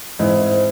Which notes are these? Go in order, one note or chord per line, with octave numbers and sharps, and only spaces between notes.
G#2 E3 G#3 C4 E4 C5 D#5
C5